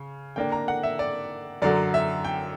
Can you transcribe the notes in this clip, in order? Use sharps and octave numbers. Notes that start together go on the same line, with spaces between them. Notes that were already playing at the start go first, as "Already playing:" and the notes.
Already playing: C#3
D3 A#3 D4 G5
A#5
F#5
E5
D5
F#2 D3 F#3 D5
E5
G5